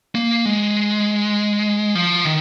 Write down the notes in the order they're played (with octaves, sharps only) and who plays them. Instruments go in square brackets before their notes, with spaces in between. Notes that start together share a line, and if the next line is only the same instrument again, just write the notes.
[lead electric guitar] A#3
G#3
F3
D#3